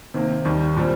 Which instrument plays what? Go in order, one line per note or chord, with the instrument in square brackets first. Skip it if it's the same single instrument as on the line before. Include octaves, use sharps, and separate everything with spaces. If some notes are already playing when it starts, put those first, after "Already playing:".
[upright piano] C3 D#3 A#3
D#2 D#3 G3
A#2 G3 C4